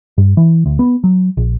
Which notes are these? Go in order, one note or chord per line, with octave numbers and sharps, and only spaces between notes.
G2
E3
D2
B3
F#3
A#1